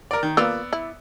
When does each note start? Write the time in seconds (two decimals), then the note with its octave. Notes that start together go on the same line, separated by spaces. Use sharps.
0.11 A#4 D5
0.23 D#3
0.37 A#3 B3 F4 D5 E6
0.73 E4